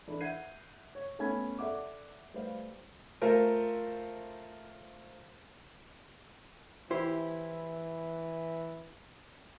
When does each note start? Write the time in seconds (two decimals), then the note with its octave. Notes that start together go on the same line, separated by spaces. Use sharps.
0.07 E3 D4 E4 A4
0.21 E5 F#5 G6 G#6 C7 D#7
0.95 C#5
1.19 A3 B3 C#4 G#5 B5 G#6
1.58 A4 D5 E5 F#5 D6
2.34 G3 A3 A4 B4 C5 F5
3.21 A3 F4 A#4 C5
6.90 E3 E4 G4 C5